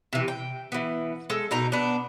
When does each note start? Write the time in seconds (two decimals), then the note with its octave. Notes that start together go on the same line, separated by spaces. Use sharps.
0.13 C3 E3
0.28 G5
0.72 E3 B3
1.30 G#3 A4
1.51 B2 D#4 A#4 A#5
1.72 B3 D4